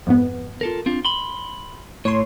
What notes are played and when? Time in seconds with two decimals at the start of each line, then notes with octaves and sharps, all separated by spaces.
0.07 F2 G#2 B3
0.61 F4 A4 A#4
0.86 C4 D4 F4
1.05 B5 C6
2.05 A2 C#5 C6